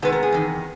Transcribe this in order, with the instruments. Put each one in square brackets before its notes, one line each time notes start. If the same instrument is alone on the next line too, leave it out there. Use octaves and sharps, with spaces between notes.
[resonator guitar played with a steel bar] C3 D#3 G#3 B3 B4
A#4
G#4
E2 C3 D#3